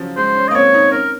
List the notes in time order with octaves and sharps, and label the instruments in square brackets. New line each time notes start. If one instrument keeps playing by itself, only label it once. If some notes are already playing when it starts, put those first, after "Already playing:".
Already playing: [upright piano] C#3 F3 F#3
[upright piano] G#3 [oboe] C5
[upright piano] C#4
[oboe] D#5
[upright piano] A#3
[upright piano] C4 [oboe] C#5
[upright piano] D#4
[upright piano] C#4 [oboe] A#4